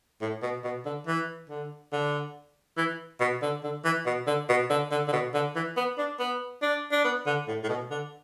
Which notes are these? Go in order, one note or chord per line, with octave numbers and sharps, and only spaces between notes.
A2
B2
B2
D3
E3
D3
D3
E3
B2
D3
D3
E3
B2
D3
B2
D3
D3
D3
B2
D3
E3
B3
D4
B3
D4
D4
B3
D3
A2
A2
B2
D3